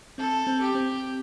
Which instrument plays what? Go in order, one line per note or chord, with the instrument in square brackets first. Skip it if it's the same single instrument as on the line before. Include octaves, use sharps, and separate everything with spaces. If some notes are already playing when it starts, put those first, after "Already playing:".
[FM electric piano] C4 [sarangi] A4
[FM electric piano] C4
[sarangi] G4
[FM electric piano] C4